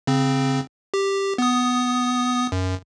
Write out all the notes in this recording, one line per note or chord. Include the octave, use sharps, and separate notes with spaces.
C#3 C4
G4
B3 D#6
F#2